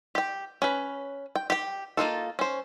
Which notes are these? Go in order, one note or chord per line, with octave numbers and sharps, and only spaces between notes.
G4 G5
C#4 B4
G5
G4 G5
A#3 D#4 F4 A4
C#4 C5